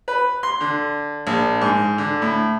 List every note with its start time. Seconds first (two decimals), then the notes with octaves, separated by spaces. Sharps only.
0.08 B4
0.43 C6
0.61 D3
1.27 A#1
1.61 G#2
1.98 D3
2.22 A2